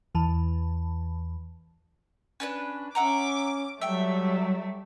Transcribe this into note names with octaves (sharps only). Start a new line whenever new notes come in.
E2 E3 A5
C#4 D4 B4
C#4 E5 F#5 A#5 D6
F#3 G3 A3 E5 G5